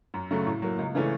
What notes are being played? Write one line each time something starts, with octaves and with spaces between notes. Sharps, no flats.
F#2
C#3 F#3 A3
A2
F#3 A#3
C#2
C#3 E3 A3 C#4